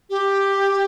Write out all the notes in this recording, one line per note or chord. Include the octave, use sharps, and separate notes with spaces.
G4